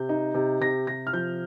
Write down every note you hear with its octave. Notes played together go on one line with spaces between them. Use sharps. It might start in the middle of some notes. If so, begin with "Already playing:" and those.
Already playing: C3 G6
D#4
C3
C3 A#6
C3 A#6
F6
F3 G6